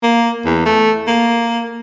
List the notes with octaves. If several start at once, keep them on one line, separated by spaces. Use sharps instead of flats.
A#3
E2
A3
A#3